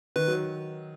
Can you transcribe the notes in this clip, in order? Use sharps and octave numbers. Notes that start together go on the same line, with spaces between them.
D#3 B4
F#3